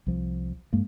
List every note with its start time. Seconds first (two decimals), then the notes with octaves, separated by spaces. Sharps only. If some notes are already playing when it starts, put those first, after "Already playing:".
0.06 C2 F3
0.73 G2 G#3 A#3